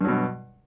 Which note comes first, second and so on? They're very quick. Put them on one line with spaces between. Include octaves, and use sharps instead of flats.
G2 F#3 B2